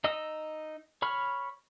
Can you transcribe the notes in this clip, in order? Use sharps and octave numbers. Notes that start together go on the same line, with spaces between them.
D#4 D#5 D#6 E6
C#5 B5 C#6 F6